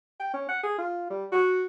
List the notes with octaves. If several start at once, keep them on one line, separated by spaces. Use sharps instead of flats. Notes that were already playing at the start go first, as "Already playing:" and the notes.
G5
C#4
F#5
G#4
F4
G3
F#4